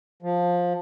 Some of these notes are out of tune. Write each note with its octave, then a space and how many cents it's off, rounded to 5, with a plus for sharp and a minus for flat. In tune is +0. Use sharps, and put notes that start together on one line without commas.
F3 +15